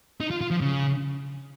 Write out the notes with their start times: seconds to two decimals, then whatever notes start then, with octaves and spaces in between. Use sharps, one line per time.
0.21 D#4
0.31 F4
0.41 F4
0.51 F3
0.61 C#3